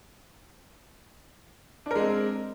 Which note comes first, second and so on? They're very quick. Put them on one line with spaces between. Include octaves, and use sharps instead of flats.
D4 A#4 G#3 C4